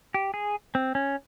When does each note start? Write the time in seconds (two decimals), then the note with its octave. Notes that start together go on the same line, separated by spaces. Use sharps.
0.14 G4
0.34 G#4
0.75 C4
0.95 C#4